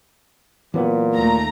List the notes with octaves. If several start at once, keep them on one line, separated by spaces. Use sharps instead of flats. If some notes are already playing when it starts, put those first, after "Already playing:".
A#2 E3 F#3 B3
D#2 A3 A#5